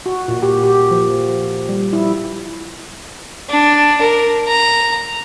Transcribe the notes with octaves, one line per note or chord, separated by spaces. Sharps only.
F#4
A#2
G4
G4
F3
G3
E4
D4
A#4
A#5